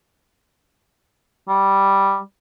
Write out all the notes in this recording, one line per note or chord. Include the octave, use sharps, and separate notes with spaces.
G3